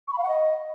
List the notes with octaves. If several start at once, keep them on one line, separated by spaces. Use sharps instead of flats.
C#6
B5
F5
F#5
D#5